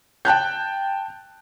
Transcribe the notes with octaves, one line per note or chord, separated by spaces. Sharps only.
G5 A5 F#6 G6